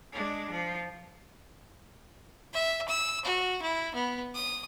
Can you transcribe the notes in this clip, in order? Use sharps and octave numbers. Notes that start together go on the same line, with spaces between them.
G#3 D4
F3
E5
E6
F#4
E4
B3
D#6